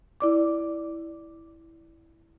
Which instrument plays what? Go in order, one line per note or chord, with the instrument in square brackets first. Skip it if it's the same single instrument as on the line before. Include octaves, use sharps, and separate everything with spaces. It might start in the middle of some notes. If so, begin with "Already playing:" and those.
[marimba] E4 D5 D6